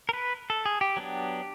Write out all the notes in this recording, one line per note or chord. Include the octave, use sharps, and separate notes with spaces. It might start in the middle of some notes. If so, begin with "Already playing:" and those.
A#4
B4
A4
G#4
G4
F#3 B3 D4